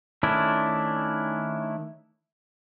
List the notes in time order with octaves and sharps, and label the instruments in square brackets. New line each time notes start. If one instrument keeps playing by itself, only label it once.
[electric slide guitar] D#3 A3 C#4 D4 E4